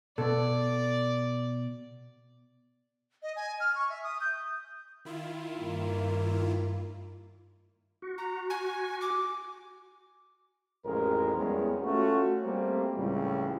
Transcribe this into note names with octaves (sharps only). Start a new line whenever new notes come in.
B2 B3 A4 D5
D#5
G#5
F6
C#6
E5
D#6
G6
D#3 E4 F4
G2 A#3
F#4
A#5
G#5
D6
A1 F2 G#3 A#4
E2 G3 G#3 B3 C#4
A3 C#4 F4 F#4
G3 A3 A#3 C4
C#2 A2 E3 G3